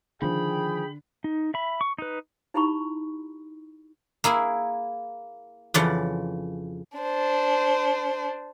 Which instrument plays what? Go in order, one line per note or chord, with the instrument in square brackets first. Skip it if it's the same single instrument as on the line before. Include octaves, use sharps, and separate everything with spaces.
[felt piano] D3 [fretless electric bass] D#3 F3 [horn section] G#4 G5 [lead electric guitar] B5
[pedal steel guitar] D#4
E5 B5
C#6
D#4 B4
[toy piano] D#4 E4 G4 A#5 B5 C#6
[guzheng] A#3 E4 G#4
F2 C#3 E3 D5 F#5
[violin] D4 C5